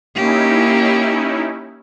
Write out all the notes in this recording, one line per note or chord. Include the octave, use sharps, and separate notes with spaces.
A#3 C#4 D#4 E4 G4